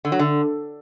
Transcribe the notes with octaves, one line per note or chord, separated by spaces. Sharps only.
D3
F#3
D3